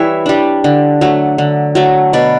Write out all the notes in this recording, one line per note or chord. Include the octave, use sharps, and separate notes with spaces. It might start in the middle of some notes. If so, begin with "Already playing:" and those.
Already playing: E3 G3 B4 C#5 E5
G3 D4
D3
F#3 A3
D3
F#3 A3
B2 B4 D5